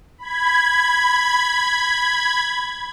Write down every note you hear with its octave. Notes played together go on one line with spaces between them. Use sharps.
B5 G#6